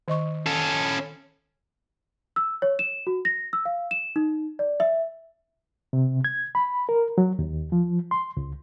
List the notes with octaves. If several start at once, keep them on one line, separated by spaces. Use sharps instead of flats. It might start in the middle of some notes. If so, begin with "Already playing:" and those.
D#3 D#5 C#6
C#4 A4
E6
C#5
E7
F#4
A#6
E6
F5
E7
D#4
D5
E5
C3
G#6
B5
A#4
F#3
D#2
F3
C6
C#2